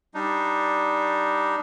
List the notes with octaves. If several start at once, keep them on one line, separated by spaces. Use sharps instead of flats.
G3 D4 D#4